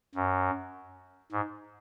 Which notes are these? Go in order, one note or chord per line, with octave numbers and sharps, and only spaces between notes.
F#2
G#2